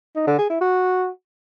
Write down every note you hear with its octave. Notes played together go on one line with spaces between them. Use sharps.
D#4
D3
G#4
E4
F#4